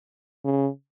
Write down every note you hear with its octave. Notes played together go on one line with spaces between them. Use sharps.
C#3